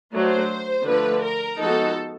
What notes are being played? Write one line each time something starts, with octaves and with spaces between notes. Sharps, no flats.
F#3 A3 D4 C5
D3 F3 A3 B4
A#4
F3 G#3 B3 D#4 F#4 A4